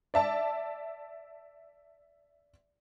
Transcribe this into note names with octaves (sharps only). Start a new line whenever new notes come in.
D5 E5 A5